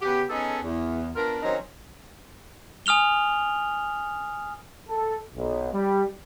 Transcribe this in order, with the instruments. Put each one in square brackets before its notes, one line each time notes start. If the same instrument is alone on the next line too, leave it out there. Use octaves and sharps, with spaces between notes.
[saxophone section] C#3 B3 F#4 G4
B3 C#4 D#4 G#4 A4
E2
B3 D4 F4 A#4
D#3 F#3 C4 C#4 D#4 C5
[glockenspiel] G#5 D#6 F6 F7 G7
[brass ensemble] A4
B1
G3